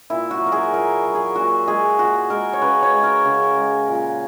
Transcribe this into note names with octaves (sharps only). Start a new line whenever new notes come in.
A#2 E4
F#4
F#3
A#4
G#4
A#2 A#4
F#3
G#4
A#2 F#4
G#3 G#4
A#2 F#4
G#3 A#4
C#5
C#3 B4
C#5
G#3
A#4
C#3
G#3
A#2